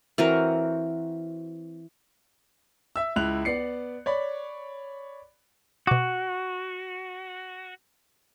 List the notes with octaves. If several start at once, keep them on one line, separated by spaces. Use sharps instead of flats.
E3 C4 F#4 A#4
E5 E6
C#2 E4 F#6 F7
B3 D5 C7 C#7
C#5 D5 B5
B2 F#4 D6